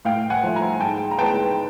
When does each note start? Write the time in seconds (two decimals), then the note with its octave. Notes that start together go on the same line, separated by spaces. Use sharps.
0.05 A2 F5 G5
0.30 F#5 G#5
0.43 F3 A3
0.56 G#5 A#5
0.81 G#2 G5 A5
1.11 A#5
1.18 E3 G#3 B3 G5 A5